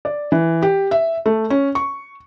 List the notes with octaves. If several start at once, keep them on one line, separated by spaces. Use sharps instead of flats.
D5
E3
G4
E5
A3
C#4
C#6